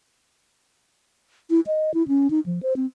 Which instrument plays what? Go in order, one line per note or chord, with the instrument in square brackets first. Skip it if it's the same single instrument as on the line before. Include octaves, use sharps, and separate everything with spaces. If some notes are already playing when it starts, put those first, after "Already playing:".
[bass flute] E4
D#5
E4
C#4
D#4
F3
C5
C4